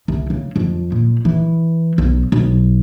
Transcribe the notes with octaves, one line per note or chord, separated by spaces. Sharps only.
C2
C#3
F2
A#2
E3
B1
B1